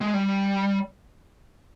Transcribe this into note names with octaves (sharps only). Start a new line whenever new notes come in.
G#3
G3